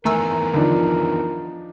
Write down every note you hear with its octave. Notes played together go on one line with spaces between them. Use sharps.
D#3 E3 A3 B3 A#4 G#5 A#5 E6
D3 F3 D4 D#4